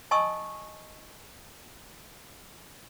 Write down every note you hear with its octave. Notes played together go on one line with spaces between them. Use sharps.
D#5 G#5 A5 C#6 D#6 E6